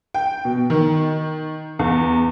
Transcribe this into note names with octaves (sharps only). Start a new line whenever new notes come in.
G5
B2
D#3
E2